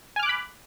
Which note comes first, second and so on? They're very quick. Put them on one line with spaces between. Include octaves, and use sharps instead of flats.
G#5 F6 D6 F#6 B5